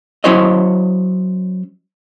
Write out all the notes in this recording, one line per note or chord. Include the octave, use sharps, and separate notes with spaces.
F#3 C#4 E4 C5 C#5 D#5